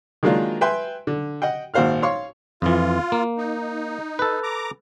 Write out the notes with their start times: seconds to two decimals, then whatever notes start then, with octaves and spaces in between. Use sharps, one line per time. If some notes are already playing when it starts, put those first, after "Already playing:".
0.23 D#3 F#3 G#3 A#3 D4 F4
0.61 B4 E5 G5 G#5 C6
1.07 D3
1.42 D#5 F#5 G5
1.74 G#1 A#2 F#4 C5 F5 F6
2.02 C#5 F5 C6 C#6
2.62 F2 E3 F4
3.12 A#3
3.38 D#4
4.19 A4 B4
4.43 A#5 D6